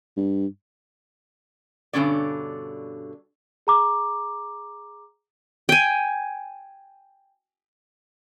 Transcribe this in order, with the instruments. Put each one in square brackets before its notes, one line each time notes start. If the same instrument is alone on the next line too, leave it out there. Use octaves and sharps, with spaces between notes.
[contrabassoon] G2
[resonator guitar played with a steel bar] G2 B2 D3 C#4 D5
[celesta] G#4 A#5 D6
[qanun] G5 G#5